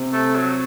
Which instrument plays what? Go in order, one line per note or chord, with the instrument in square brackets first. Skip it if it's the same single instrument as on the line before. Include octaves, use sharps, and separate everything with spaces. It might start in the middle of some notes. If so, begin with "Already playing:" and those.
Already playing: [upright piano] C3 C4
[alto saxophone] A3
F#3